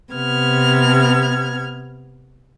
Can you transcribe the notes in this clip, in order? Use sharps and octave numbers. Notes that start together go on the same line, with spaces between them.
C3 B3 F6 G#6